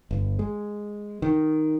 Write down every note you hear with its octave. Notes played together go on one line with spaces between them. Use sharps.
G1
G#3
D#3